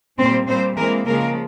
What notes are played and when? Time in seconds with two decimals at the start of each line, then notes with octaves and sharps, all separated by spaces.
0.18 A#2 G3 A#3 C4 C5
0.47 A#2 G3 A#3 C4 C5
0.77 E3 G#3 A#3 C4 A#4
1.05 C#3 F3 G#3 A#3 A#4